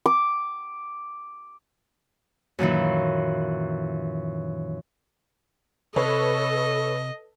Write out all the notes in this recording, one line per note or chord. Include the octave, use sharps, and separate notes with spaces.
D6
F#2 A#2 D#3 E3
C3 A4 B4 C#5 D#5